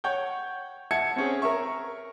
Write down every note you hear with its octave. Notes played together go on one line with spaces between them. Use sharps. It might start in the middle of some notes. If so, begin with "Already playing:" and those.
C#5 F#5 G5 G6
E5 F#5 A5 G#6 C#7
C4 C#4 G#4
A#4 C#5 E5 C#6